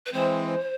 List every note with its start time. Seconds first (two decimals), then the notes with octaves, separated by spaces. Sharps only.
0.06 B4
0.13 E3 G#3 C4 C5